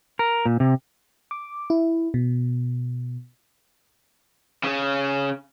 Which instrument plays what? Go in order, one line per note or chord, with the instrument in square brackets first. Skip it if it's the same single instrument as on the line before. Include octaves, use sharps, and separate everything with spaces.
[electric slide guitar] A#4
A#2
C3
[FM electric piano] D6
E4
B2
[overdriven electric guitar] C#3 C#4